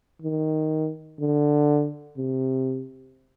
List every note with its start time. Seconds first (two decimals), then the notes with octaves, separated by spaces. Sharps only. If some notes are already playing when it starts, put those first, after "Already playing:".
0.22 D#3
1.20 D3
2.17 C3